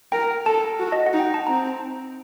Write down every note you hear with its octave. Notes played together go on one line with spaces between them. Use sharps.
A#4 G5
A4 A5
F#4
D#5
F#5
D#4
G5
A5
C4 A#5